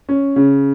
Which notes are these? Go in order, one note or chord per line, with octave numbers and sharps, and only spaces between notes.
C#4
C#3